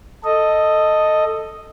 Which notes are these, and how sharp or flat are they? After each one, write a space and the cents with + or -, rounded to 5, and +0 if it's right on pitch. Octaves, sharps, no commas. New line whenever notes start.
A4 +5 D#5 +0